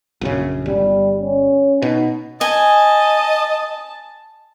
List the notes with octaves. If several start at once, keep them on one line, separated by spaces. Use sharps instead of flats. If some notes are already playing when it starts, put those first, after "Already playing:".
A#1 F#2 C#3
G1 G3
C#4
B2 D#4
D#5 G#5 A5